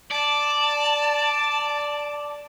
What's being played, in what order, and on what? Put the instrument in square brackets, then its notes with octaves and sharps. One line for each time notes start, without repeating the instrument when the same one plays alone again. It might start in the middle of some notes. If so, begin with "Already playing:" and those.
[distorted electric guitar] D5 [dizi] A5